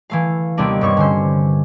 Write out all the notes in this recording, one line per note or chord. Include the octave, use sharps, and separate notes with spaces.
E3 A3 F5
D#2 C3 G3 B3 D4 D#5
G2 C4 C#5 C#6
D3 C#4 C5